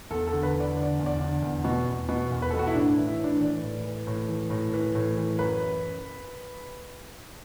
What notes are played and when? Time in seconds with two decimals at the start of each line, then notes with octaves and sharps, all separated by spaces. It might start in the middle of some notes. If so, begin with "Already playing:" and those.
0.10 E2 A4
0.27 A4
0.32 D3
0.43 B4
0.54 E2
0.60 D5
0.77 D3
0.83 D5
0.99 E2
1.06 D5
1.21 D3
1.42 E2
1.65 B2
1.87 E2
2.09 B2
2.31 E2
2.42 B4
2.51 B2 A4
2.59 F#4
2.67 E4
2.74 A2 D4
2.92 E4
2.97 E3
3.07 E4
3.18 A2
3.24 D4
3.41 E3 D5
3.63 A2
3.84 E3
4.07 A2
4.29 E3
4.50 A2
4.73 E3
4.95 A2
5.17 E3
5.39 F#2 B4